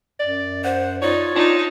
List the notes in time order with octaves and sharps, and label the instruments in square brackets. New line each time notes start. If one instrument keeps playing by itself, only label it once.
[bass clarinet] F#2 [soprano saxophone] D5
[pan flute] C5 [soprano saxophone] F#5
[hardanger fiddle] D#4 [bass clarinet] F4 [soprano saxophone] C#5 [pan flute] D5
[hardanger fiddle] D4 D#4 [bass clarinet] F4